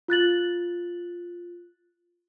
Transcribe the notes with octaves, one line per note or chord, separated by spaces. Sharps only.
F4 F#6 A6 F#7